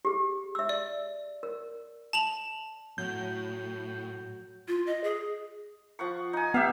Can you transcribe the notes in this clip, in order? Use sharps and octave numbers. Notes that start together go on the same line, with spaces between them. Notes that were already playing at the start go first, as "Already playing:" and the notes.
G4 G#4
E5 E6
D5
A#4
A5 F7 F#7
A2 F#3 G6
F4
D#5
G#4
F3 F#5 C#6
D#4 G#5
B3 G4 E5 F5